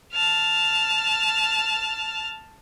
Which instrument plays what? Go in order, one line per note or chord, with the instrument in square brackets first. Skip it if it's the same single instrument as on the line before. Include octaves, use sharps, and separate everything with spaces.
[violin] A5 F6